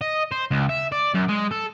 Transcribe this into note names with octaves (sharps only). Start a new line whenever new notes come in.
D#5
C5
C#2
E5
D5
F#2
G#3
A4